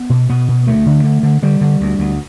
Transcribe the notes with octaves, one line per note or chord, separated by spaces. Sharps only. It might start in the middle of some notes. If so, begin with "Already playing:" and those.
Already playing: B3
B2
B2 B3
B2
D2 A3
D3
D3
D3
D3 G3
D3
D2
D2